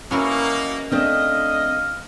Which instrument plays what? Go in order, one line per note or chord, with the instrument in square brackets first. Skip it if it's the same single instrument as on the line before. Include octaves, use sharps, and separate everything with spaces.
[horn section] B2 A#3 [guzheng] C#4 E4 A#4
[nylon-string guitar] A3 C4 D4 [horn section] D#5 [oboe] F5